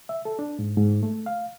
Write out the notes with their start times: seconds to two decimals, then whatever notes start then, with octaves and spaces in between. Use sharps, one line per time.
0.09 E5
0.25 A4
0.39 D4
0.59 G#2
0.77 G#2
1.03 A3
1.26 F5